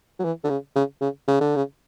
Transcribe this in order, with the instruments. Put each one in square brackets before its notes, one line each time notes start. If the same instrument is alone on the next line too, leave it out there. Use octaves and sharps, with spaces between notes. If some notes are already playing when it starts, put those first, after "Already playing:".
[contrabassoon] F#3
E3
D3
C#3
C#3
C#3
C#3
D3
C#3